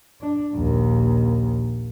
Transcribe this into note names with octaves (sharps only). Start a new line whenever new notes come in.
D4
A#1 D#2